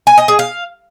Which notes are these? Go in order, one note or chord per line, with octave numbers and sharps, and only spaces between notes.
G#5
D#5
G#4
F5